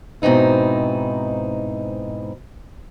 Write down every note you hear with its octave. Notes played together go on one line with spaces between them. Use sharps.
G#2 B2 C4 D#4 E4